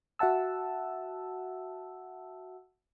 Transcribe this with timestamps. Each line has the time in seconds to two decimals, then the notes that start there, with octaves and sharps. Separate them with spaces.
0.19 F#4 E5 F#5 A5 E6